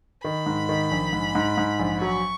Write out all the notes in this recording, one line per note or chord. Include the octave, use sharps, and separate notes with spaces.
D#3 B5
G#2
D#3
A#1
G#2
G#2
G#2
A#1
F#3 C#6